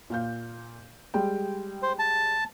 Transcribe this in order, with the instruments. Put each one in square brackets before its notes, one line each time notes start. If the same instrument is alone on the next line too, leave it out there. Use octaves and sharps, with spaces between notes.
[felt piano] A#2 F5 G6
G3 G#3 G5
[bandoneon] C5
A5